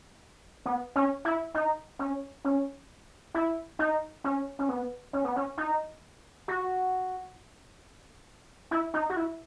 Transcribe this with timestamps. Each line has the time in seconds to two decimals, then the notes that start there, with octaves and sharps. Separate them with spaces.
0.66 B3
0.96 C#4
1.25 E4
1.54 D#4
1.99 C#4
2.45 C#4
3.34 E4
3.79 D#4
4.24 C#4
4.59 C#4
4.69 B3
5.13 C#4
5.24 B3
5.36 C#4
5.58 D#4
6.48 F#4
8.71 E4
8.94 D#4
9.10 F#4
9.16 E4